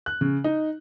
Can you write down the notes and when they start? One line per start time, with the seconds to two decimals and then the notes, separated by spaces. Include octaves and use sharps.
0.06 F#6
0.21 C#3
0.44 D#4